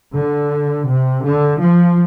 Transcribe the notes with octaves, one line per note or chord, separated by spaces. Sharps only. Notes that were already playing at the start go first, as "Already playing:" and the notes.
D3
C3
D3
F3